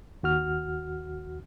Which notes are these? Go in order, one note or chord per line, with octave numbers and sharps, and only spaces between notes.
D#2 F#4 F6